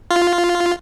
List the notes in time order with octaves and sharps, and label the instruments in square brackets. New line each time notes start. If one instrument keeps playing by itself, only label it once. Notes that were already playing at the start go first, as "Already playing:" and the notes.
[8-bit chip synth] F4